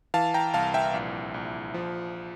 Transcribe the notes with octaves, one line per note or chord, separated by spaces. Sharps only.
E3 F5 A5
G5 A#5
C2 F5 A5
E5 G5
A#1
A#1
F3